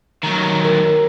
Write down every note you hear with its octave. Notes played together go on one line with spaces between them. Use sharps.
D#3 F#3
A#4